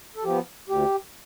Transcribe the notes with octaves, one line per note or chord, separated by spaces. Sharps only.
A4
F3 B3 G4
D2 G4